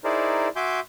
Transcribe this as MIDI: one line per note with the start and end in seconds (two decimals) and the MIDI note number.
0.04 0.48 63
0.04 0.48 64
0.04 0.48 68
0.04 0.48 70
0.04 0.48 72
0.04 0.48 74
0.56 0.80 66
0.56 0.80 76
0.56 0.80 80
0.56 0.80 84
0.56 0.80 86
0.56 0.80 91